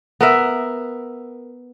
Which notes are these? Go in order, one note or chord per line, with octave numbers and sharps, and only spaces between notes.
B3 A#4 E5